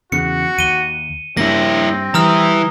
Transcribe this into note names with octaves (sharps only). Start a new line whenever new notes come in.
E2 C#3 F#4 C#7
D#2 D#7 G7
G2 A#3 C4 E4 A#6
E3 G3 E4 A#5 D#6 F6